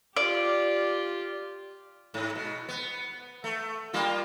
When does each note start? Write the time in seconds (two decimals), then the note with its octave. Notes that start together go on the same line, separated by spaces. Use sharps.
0.16 F4 G4 D5
2.14 G#2
2.35 B2
2.69 B3
3.44 A3
3.93 G3 A#3 F4